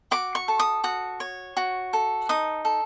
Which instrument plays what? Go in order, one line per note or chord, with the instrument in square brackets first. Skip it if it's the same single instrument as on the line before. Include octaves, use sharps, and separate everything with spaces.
[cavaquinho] F#4 D6
C#6
A4
D#6
F#4 D#6
C#5
F#4
A4
D#4 D#6
A4